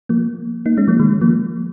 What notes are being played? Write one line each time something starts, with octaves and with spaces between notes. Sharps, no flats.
F3 A#3
A#3 D#4
G#3 C#4
F3 A#3
D#3 G#3
F3 A#3